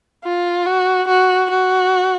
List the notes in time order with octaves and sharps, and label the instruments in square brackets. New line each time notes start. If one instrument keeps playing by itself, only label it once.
[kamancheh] F4
F#4
F#4
F#4